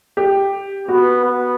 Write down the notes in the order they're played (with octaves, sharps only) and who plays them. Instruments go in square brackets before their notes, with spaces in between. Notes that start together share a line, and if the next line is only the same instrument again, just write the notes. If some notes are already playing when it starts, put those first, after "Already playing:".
[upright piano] G4
[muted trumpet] B3 [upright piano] F#4
[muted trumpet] B3